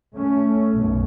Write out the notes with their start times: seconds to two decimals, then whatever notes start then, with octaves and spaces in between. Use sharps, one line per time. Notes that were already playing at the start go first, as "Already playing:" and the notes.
0.15 A3 C#4
0.74 B1 F#2 B2